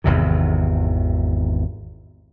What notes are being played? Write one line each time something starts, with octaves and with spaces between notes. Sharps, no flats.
G#1 E2 C3 D#3